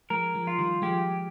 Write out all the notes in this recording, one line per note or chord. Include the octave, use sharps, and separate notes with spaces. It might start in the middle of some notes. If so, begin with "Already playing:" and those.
F3 G#3 A#4
F3 G#3
F4
D#3 G3
F3 G#3 G4